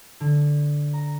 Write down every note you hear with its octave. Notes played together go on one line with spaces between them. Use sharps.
D3
A#5